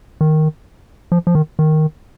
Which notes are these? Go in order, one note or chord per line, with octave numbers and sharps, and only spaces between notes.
D#3
F3
F3
D#3
D#3